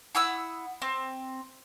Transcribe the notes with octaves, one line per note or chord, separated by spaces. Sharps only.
E4 F#5 D#6 E6
C4